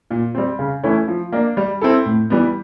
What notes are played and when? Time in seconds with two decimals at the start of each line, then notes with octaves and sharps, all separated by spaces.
0.11 A#2
0.35 G3 C4
0.59 C#3
0.83 E3 A3 C#4 E4
1.08 F3
1.32 A#3 D4
1.57 G3
1.81 C4 E4 A4
2.06 A2
2.30 E3 G3 B3